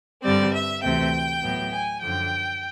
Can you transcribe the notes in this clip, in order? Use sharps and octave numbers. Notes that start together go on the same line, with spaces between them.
G2 D3 G3 C4 D5
E5
D2 C3 E3 A3 C4 G5
A2 F#3 B3
G#5
F#2 D3 F3 G5